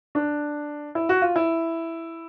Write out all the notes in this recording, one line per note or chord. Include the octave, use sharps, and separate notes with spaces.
D4
E4
F#4
F4
E4